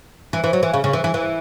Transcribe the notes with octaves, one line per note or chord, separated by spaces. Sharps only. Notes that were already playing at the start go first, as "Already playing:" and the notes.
E3
E3
F#3
E3
C#3
C#3
E3
E3
E3